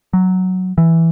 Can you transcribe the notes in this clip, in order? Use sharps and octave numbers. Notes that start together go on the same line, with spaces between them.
F#3
E3